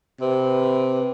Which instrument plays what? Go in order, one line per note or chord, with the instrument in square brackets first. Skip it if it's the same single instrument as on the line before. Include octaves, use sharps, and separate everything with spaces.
[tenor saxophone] C3 [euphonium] B4